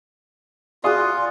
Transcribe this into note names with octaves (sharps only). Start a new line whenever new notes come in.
F4 F#4 G#4 D5 F5 C6 D#6